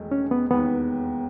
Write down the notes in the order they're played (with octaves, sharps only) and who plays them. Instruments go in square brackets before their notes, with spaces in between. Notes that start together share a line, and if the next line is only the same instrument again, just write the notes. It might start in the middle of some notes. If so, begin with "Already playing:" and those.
Already playing: [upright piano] E1 E2 D#3 A3 D#4
[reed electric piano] C#4
B3
[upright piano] E1 D#2 D#3 [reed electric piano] B3